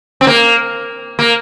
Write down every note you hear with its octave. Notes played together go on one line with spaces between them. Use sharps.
C4
A#3
A#3